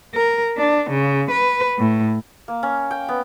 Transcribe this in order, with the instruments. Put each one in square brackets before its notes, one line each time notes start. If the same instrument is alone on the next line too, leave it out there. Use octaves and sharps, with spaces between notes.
[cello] A#4
D4
C#3
B4
A2
[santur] A#3
C#4
G5
B3